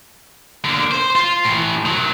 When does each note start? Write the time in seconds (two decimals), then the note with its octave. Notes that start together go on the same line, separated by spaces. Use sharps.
0.65 D3 A#3
0.92 C5
1.16 F4
1.45 A2 E3
1.86 D#3 F#3